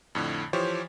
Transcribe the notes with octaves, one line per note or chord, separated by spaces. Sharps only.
F2 A2 D3
E3 F3 G4 C5 C#5